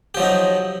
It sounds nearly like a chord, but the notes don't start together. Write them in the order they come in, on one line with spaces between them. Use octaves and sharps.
G4 F3 F#3 D#4